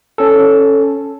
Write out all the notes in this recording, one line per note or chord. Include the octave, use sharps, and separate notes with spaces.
C#4 A4